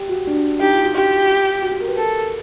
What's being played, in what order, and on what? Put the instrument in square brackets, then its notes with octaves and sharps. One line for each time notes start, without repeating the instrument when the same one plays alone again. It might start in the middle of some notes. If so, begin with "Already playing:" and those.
Already playing: [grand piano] G4
F#4
D4
[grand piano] D#4 [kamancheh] G4
[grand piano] F4
F#4
[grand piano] F4 [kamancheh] G4
[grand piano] F#4
G4
A#4
B4
[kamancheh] A4 [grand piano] A#4